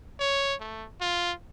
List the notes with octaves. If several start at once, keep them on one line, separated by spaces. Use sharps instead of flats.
C#5
A3
F4